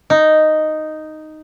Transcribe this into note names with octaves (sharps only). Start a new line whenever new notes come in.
D#4